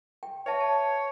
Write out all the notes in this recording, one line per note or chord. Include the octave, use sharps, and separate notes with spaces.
G5
B4 C#5 E5 A5
A5